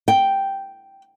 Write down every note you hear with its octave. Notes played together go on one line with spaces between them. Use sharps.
G5